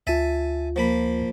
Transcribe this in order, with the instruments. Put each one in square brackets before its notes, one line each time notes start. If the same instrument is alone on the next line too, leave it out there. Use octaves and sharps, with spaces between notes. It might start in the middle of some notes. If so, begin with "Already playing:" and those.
[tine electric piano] D2 F4 [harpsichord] E5 G#5 A5
[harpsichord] F3 A#3 B5